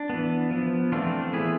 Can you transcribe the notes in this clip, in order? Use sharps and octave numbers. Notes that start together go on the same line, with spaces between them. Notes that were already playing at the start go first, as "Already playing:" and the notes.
Already playing: D4
E3 B3
F3 B3
E3 A3 C4 D4 F4
E3 B3 E4 G#4